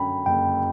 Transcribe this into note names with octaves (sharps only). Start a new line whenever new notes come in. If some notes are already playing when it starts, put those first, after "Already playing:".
Already playing: F#2 D3 G5 B5
F#1 G5